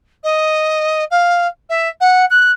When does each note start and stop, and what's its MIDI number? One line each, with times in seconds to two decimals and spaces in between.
0.24 1.04 75
1.11 1.47 77
1.69 1.89 76
2.01 2.25 78
2.30 2.52 90